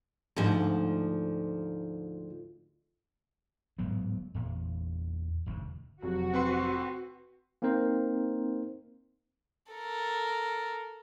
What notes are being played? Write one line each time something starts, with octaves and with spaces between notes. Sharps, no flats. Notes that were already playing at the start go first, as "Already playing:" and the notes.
D2 G#2 F3
D1 G#2 F#3 B3
E2 A#2
E1 D2 G#2
F1 F#3 F#4
C4 B4 C6
A#3 C4 D#4 A#4 C5
A4 A#4